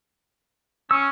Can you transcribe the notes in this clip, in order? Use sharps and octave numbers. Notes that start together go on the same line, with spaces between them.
C#4 E6